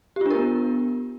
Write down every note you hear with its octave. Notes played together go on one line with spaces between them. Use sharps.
B3 D4 F4 G4 A#4